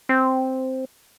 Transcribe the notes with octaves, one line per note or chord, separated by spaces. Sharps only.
C4